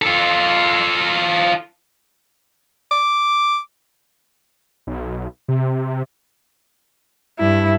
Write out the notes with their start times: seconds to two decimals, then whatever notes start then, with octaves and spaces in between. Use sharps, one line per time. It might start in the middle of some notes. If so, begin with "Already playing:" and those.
0.02 F4 A4
2.91 D6
4.87 B1
5.48 C3
7.39 G2 E4